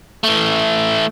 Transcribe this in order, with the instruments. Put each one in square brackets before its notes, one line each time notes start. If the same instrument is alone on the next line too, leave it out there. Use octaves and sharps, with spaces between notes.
[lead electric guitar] E3 A3